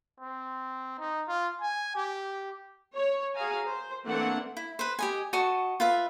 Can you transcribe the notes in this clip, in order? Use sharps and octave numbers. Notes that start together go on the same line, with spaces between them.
C4
D#4
F4
G#5
G4
C#5
F#4 G#4 F5 G#5 A#5
C5
E3 A3 A#3 C4 D4 F#5
E4
B4 C5
G4 D#5 G#5
F#4 D#5 A5 C#6
F4 B4 E5